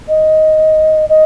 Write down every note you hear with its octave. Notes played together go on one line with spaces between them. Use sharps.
D#5
D#5